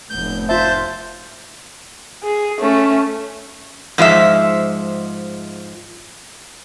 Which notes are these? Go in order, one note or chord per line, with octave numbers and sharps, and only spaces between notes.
F1 A2 B3 G6
F4 C5 E5 A5 G6
G#4
A3 C#4
G#2 F3 G#3 E5